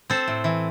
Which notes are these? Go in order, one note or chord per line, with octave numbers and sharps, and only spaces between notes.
C4 A4 C5
A2
E3